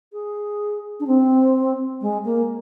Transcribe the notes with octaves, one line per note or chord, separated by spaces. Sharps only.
G#4
D4
C4
G#3
A#3